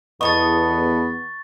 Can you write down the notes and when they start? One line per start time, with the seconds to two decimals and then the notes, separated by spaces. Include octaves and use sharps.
0.21 E2 B3 A4 D#5 C#6 A6